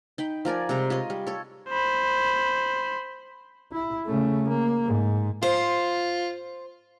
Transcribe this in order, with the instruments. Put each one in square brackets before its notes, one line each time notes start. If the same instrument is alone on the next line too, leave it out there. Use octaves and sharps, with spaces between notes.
[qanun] D#4 G5 B5
F3 A#4 D5 G#5
C3 G3 G#3 A#5
F4 C#5 D#5
G3
A4 C#5
[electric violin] C5 B5
[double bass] E4
C#3 A3
A#3
G#2
[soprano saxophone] F4 [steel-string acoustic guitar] C5